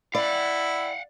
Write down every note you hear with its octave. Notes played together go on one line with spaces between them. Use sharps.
E4 D5 F5 F#5